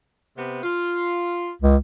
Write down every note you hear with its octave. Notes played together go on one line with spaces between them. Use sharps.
C3 B3
F4
C#2